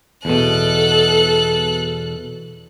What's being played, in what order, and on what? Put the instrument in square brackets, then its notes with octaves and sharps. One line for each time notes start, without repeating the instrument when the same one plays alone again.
[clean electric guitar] E2 B2 [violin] A4 F#6